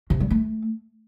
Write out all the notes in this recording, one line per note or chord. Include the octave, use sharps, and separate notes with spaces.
C3
G3
A3